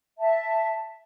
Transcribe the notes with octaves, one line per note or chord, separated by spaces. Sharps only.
E5 A5